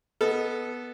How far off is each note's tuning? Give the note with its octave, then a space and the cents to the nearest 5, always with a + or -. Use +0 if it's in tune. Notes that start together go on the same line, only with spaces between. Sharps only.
B3 -5 A4 -10 D#5 +10